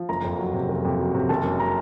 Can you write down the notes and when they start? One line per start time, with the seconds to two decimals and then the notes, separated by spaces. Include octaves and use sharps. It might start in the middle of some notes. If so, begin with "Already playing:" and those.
Already playing: F3
0.09 F#1 A#5
0.24 F2
0.39 F#3
0.54 C3
0.69 F#1
0.85 F2
1.00 F#3
1.14 C3
1.29 F#1 A5
1.45 F#2
1.60 A#5